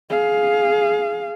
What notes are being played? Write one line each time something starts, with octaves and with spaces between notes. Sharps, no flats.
G#4 F5